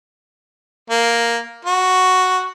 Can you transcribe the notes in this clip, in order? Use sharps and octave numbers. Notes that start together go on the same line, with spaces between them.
A#3
F#4